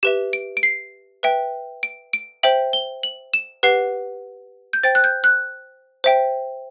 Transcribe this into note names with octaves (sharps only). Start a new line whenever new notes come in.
G4 B4 E5 E7
D7
D7
C7
B4 E5 G5
D7
D7
C5 E5 G5 F#7
G7
F#7
E7
G4 B4 F#5 C7
G6
C5 G5 A6
F#6
G6
F#6
C5 E5 G5